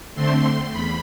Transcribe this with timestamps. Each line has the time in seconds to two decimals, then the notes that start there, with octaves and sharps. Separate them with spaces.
0.15 D3 A3 C4 C6
0.72 E2 B5